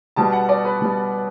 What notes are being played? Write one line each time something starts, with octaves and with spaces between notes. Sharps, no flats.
B2 G3 B3 A5
F#5
D5
B4
B2 G3 B3